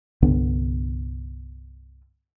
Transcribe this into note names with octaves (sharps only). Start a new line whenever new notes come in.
C2 G2 D3 B3